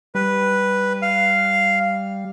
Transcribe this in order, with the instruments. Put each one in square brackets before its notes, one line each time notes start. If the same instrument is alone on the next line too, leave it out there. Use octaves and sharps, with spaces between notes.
[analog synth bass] G3 [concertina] B4
[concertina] F5